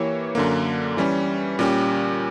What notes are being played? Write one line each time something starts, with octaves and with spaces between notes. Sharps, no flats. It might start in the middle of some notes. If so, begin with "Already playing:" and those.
Already playing: E3 A#3 E4 G4 C#5
F#2 D3 A#3
E3 G3 C#4
A#2 G3 C#4 G4